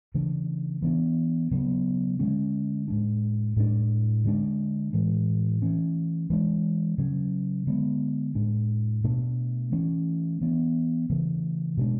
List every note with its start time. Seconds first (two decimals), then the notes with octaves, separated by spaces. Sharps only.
0.14 C#3 E3 A3 D4
0.82 E3 B3 D4
1.51 C#3 F#3 B3
2.19 D3 G#3 C#4
2.88 A2 G#3 D4
3.57 A2 G#3 B3 D4
4.24 D3 G#3 D4
4.93 A2 E3 G#3
5.62 E3 A3 C#4
6.30 E3 G#3 D4
6.98 C#3 F#3 C#4
7.67 D3 G#3 B3
8.35 A2 G#3 D4
9.04 B2 A3 D4
9.72 E3 A3 C#4
10.41 E3 B3 D4
11.10 C#3 E3 A3
11.77 B2 G#3 D4